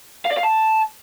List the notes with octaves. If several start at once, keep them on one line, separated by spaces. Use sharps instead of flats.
F5
D5
F5
A5